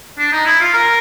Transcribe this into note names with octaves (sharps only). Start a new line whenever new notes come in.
D4
D#4
E4
F4
A#4